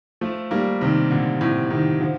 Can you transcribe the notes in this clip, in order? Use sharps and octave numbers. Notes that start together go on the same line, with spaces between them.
F3 A3
G3 A#3
C3 D#3
A#2 D3
A2 C3
C3 D#3
D3 F3